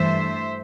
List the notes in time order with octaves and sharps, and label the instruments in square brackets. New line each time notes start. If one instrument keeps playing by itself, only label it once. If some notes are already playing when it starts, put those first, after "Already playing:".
Already playing: [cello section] G2 E3 A3 C5 E5